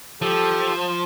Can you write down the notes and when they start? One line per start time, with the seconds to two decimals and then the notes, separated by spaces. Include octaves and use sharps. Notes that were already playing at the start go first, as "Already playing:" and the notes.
0.22 F3 G4 A4